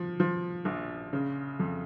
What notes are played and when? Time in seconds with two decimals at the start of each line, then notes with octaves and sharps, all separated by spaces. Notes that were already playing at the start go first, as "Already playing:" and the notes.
Already playing: F3
0.20 F3
0.65 A#1
1.13 C#3
1.59 F2